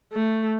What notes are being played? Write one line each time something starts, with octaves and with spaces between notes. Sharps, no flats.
A3